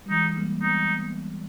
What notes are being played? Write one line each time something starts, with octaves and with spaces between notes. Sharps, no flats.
G3
E3 G#3 D#4
G#3
G3 A#3
G#3 B3 D#4